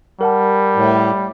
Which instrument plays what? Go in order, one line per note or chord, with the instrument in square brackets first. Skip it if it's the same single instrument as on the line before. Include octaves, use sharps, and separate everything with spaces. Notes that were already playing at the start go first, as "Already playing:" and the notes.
[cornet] G3 [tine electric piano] A#4 F#5 A5
[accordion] A2